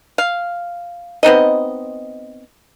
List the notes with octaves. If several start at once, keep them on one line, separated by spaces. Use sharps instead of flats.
F5
B3 C4 D#4 D#5